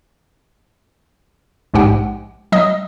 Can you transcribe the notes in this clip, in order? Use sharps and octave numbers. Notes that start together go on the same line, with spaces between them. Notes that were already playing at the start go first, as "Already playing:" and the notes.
A#1 G#2 G#3 G4 F#5 G5
F#3 D#5 D#6